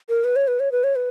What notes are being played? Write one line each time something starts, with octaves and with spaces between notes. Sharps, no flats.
A#4
B4
C#5
B4
C#5
B4
C#5
B4